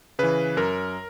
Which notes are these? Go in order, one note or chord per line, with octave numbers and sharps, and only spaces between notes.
C#3 E3 B4
F#2 A#4